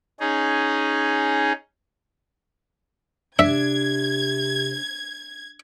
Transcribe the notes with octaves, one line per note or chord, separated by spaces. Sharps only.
C#4 D#4 G#4
C3 D4 E5 G#6